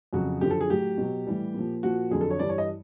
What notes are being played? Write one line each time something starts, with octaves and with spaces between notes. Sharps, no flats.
F2 C#3 F#3 F#4
F#2 D3 F3 G4
A4
G#4
A2 F#3 G4
B2 F#3
A2 E3 G3
A#2 F3
A#2 F3 F#4
F2 D3 F#3 G#4
A4
C#5
G2 E3 G3 D5
C#5
D#5